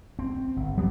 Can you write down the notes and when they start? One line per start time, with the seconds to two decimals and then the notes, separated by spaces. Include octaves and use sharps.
0.19 C4
0.56 G1
0.77 F#3 B3 D4